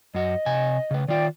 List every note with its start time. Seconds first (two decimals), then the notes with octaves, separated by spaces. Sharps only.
0.15 F#2 F#4 D#5
0.46 C3 G#5
0.91 C#3 B4
1.08 D#3 F4 D5 G5